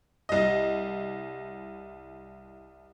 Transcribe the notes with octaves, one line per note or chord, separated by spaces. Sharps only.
C2 D#5